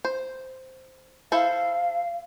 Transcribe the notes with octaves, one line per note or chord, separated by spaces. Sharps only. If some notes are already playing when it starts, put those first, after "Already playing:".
C5
E4 A4 C5 F5